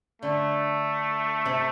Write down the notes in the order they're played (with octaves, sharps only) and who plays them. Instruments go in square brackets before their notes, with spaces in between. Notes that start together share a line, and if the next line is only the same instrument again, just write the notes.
[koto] D3 [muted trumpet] A3
[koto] C3